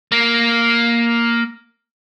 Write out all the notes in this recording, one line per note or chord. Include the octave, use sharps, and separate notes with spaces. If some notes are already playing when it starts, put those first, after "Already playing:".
A#3